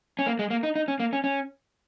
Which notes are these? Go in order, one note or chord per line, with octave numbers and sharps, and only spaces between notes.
C#4
A#3
G#3
A#3
D#4
D#4
C#4
A#3
C#4
C#4